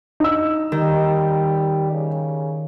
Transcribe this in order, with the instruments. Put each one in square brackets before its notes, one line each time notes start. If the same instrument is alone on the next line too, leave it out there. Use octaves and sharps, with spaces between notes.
[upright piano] D#4 E6
[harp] D#3 [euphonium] G3
[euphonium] C#3